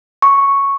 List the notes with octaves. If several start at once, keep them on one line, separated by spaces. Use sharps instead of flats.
C#6